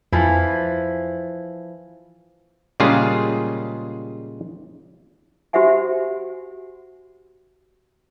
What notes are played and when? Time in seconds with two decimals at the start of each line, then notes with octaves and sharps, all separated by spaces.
0.13 F2 E3 F3 E4
2.80 A#2 C#3 G3 G#3 F4 G#4
5.53 F#4 G4 C5 E5 F#5 G#5